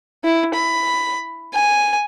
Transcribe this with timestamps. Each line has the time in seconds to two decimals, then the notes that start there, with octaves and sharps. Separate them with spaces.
0.24 E4
0.54 B5
1.54 G#5